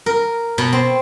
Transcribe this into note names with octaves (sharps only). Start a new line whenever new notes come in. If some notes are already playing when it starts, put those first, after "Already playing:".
A#4
B2
C4